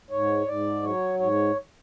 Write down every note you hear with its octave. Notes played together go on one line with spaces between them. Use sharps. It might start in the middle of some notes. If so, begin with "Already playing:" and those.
G#2 C#5
G#2 D5
F#3 C#5
G#2 C#5